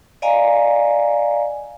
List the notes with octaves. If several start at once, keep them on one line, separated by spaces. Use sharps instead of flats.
D5 D#5 F5 G#5 A#5